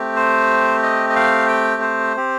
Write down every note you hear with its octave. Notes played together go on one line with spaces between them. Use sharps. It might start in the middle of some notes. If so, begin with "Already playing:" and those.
Already playing: A3 C4 G4
C5
D#5
D#5
F5
G5
C5
C4 G4